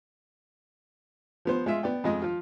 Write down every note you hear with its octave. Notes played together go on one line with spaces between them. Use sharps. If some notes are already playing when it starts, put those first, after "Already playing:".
F3 B3 C5
G#3 F4 E5
B3 D5 G5
F2 G#3 D#5
F3 F4